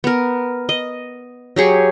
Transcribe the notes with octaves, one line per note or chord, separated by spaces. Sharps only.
B3 A#4
D#5
F#3 G4 G#4 C#5